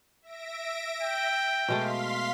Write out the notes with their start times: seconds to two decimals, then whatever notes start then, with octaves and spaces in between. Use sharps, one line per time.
0.22 E5 A#6 D7
1.03 G5
1.68 B2 G#3 A3 F5 C6 B6